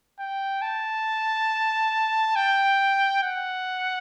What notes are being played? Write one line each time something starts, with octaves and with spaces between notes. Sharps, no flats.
G5
A5
G5
F#5